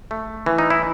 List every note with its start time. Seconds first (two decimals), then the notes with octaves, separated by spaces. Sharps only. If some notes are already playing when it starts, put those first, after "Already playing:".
0.11 A3
0.46 E3
0.58 D#4
0.70 E4